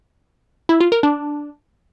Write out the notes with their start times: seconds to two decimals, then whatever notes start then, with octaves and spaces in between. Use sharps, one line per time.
0.69 E4
0.81 F4
0.92 A#4
1.03 D4